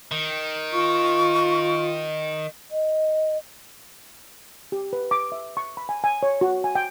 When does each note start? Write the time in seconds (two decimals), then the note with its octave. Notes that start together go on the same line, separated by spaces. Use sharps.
0.12 D#3
0.73 F4 C#6
2.71 D#5
4.72 G4
4.93 B4
5.11 D6
5.32 E5
5.57 C#6
5.77 B5
5.89 G#5
6.04 G#5
6.23 C#5
6.41 F#4
6.64 G#5
6.75 G5